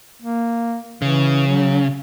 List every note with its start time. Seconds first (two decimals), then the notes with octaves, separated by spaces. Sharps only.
0.22 A#3
1.02 C#3 E3
1.48 F#3